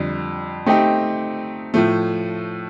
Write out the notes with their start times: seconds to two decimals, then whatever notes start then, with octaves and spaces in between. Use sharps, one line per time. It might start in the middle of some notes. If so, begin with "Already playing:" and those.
Already playing: F2 D3 G3
0.66 A3 C4 D#4 G4
1.74 A2 F3 A3